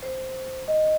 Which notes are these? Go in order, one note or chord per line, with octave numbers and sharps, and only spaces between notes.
C5
D#5